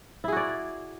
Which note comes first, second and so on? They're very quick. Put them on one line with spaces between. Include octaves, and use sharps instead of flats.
E4 G#4 F#4 D5